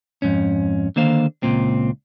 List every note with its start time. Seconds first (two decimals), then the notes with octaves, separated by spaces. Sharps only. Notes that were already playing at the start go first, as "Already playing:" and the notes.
0.22 F2 G#2 C#4
0.96 D3 D#3 A#3 C5 F5
1.43 C#2 A#2 C4